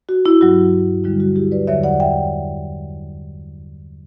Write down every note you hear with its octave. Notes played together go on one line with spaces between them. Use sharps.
F#4
E4
G2 F#3 F#4
D2 D3 G3 E4
F#4
E4 G4
B4 D5
E2 D3 F#3 C#5 E5
D5 F#5
E5 G5